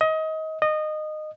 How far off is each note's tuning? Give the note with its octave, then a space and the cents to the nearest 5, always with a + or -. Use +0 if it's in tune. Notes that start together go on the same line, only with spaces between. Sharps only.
D#5 +25
D#5 -20